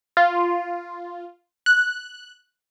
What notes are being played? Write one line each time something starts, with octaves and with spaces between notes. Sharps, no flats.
F4
F#6